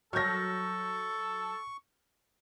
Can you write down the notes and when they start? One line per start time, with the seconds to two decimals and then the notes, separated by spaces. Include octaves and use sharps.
0.13 F#3 A4 C#5 C#6 F6 G6 A#6